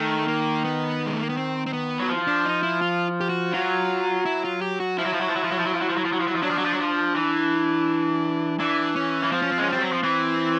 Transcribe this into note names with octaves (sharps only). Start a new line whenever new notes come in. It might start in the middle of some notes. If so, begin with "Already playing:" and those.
Already playing: D#3 A3
A#3
B3
G#3
A3
A#3
B3
C4
C4
B3
F#3
F3
D4
D#4
E4
F4
G4
F#4
F#3 F4
E4
F4
G4
F#4
F3 E4
F#3
F3
F#3
F3
F#3
F3
F#3
F3
F#3
F3
F#3
F3
F#3
F3
F#3
F3
F#3
F3
F#3 D4
F3
F#3
F3
F#3
F3
E3
E3 D4
C#4
E3
F3 C4
C#4
C4
G#3 C#4
G3 C4
F#3
F3
E3 C4